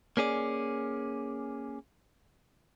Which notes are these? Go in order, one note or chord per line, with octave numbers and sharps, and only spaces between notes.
A#3 C#4 G#4 D5